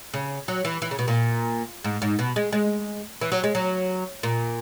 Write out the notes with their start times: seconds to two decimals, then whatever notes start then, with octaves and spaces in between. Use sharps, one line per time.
0.14 C#3
0.48 F#3
0.65 E3
0.82 E3
0.91 C#3
0.99 B2
1.08 A#2
1.84 G#2
2.02 G#2
2.19 B2
2.36 G#3
2.53 G#3
3.21 E3
3.32 F#3
3.44 G#3
3.55 F#3
4.23 A#2